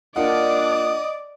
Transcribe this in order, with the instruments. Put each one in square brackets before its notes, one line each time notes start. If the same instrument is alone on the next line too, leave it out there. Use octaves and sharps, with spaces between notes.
[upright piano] A#3 F4 F#5 [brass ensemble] D4 [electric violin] D5 D6 [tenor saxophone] D#5